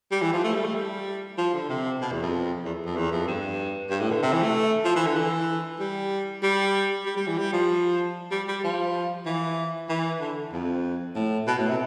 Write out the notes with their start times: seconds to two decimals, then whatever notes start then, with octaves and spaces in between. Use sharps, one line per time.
0.11 G3
0.22 E3
0.33 F3
0.44 A3
0.54 G3
0.64 A3
0.75 G3
1.38 F3
1.53 D3
1.69 C3
2.01 B2
2.11 E2
2.22 F2
2.64 E2
2.86 F2
2.96 E2
3.12 F2
3.27 G2
3.90 G2
4.01 A2
4.11 D3
4.22 C3
4.33 E3
4.42 A3
4.85 F3
4.96 E3
5.06 D3
5.16 E3
5.79 G3
6.43 G3
7.06 G3
7.17 G3
7.27 E3
7.38 G3
7.53 F3
8.31 G3
8.48 G3
8.64 F3
9.26 E3
9.89 E3
10.20 D3
10.52 F2
11.15 A2
11.47 B2
11.58 A2
11.68 C3